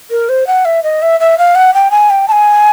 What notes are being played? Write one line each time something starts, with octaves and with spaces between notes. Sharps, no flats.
A#4
C5
F#5
E5
D#5
E5
E5
F5
F#5
G5
G#5
G5
A5
G#5